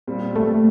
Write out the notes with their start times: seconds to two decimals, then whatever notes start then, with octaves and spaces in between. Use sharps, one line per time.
0.07 A#2 G3 C4
0.36 A3